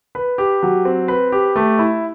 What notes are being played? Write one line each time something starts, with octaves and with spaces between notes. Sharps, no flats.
B4
G4
F#3
C4
B4
G4
A3
E4